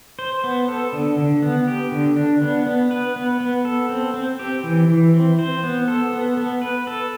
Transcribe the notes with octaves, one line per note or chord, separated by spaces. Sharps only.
C5
B3
A4
D3
D3
B3
G4
D3
D4
B3
B3
B4
B3
B3
A4
C4
C4
G4
E3
E3
C4
C5
B3
A4
B3
B3
B4
A4